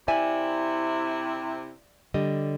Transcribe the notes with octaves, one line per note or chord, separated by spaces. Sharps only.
C3 E4 D5 E5 G#5
D3 G3 D#5